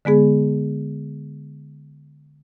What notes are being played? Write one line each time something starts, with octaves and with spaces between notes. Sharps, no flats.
D3 G#3 B3 G#4